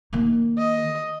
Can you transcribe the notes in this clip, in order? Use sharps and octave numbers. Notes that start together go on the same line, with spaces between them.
D#3 A#3
D#5